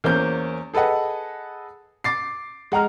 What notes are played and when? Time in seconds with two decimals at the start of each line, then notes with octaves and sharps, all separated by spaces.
0.04 E2 A#3 C#4 C5 G6
0.74 G#4 A4 B4 D#5 F#5
2.04 D6 A6 C7
2.72 G#3 F#5 A#5 F6